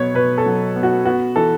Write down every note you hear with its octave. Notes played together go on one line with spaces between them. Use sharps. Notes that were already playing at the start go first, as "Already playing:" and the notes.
Already playing: B2 F#3 B3 C#5
B2 B4
A4
F#3
B3
F#4
B3 F#4
E3 A4